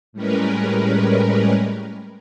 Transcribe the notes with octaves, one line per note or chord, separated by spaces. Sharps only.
A2 G3 G#3 C#4 A#4 B4